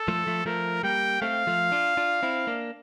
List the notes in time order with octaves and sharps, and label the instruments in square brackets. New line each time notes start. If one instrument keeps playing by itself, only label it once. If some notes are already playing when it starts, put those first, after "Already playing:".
Already playing: [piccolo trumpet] A4
[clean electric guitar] F3 A3
F3 A3
[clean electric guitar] F3 A3 [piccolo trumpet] A#4
[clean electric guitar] G3 A#3 [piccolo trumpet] G5
[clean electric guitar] A3 C4 [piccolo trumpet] F5
[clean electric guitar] F3 A3
D4 F4
D4 F4
C4 E4
A#3 D4